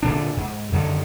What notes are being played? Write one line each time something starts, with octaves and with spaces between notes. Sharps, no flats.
D2 A#2 D3 D4
G#2
F#2 D3 D#3 F#3